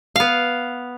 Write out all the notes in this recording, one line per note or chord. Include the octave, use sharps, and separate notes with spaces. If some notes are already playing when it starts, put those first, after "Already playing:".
B3 F5